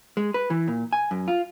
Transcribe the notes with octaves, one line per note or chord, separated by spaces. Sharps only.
G#3
B4
E3
A#2
G#5
F#2
F4